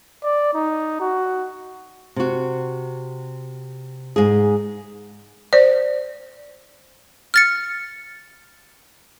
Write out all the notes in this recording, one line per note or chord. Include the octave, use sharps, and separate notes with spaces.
D5
D#4
F#4
C3 F#4
G#2 G#4
C5 D5
F6 A6 C#7